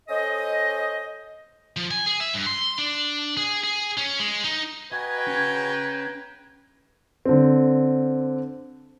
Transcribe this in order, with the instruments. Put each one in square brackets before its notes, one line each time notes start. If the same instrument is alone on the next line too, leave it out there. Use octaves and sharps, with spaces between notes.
[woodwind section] C#4 A4 C5 D#5
[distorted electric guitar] F3
G#5
G#4
E5
G2
C6
D4
G#4
G#4
C#4
G#3
D#4
[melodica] F#4 G#5 [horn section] B4 G5 A#5 [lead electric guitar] D#5 [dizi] G#6
[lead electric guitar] C#4 G#4
[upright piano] D3 C4